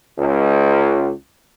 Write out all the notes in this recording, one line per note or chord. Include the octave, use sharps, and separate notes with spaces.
C#2